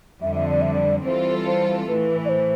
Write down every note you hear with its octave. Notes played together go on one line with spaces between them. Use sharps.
F2 D3 G3 E5
E5
D5
E5
D5
E3 G3 C4 F4 A4 C5
C5
A2 E3 A3 B4
D5
C5